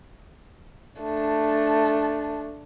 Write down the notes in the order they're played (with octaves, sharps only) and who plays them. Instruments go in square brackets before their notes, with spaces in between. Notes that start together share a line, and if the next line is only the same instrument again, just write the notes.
[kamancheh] A3 D4